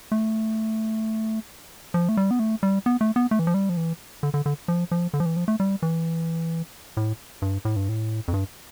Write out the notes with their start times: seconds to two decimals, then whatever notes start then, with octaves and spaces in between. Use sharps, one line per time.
0.12 A3
1.94 F3
2.09 A3
2.17 G3
2.31 B3
2.39 A3
2.63 G3
2.86 B3
3.01 A3
3.16 B3
3.31 A3
3.39 E3
3.47 F3
3.54 G3
3.69 F3
3.77 E3
4.23 D3
4.34 D3
4.46 D3
4.68 F3
4.91 F3
5.14 D3
5.20 F3
5.26 E3
5.37 F3
5.48 A3
5.60 G3
5.82 E3
6.97 A2
7.42 G2
7.65 A2
7.76 G2
7.89 A2
8.28 F2
8.34 G2